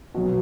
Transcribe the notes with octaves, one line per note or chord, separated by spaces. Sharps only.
B2 F#3 F#4